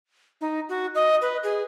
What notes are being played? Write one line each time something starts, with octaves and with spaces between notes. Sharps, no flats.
D#4
F#4
D#5
B4
G#4